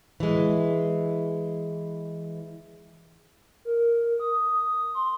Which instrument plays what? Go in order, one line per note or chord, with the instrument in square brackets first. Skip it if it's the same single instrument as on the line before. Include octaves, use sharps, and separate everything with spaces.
[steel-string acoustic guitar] E3 G#3
[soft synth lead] A#4
D#6
C6